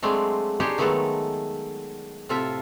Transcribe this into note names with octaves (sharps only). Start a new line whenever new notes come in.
F#3 G#3 A3 C4 D4
D4 D#4 G4 G#4 C5 C#5
D#3 F#3 G#3 A3 B3 A4
A2 C3 F4 A4 E5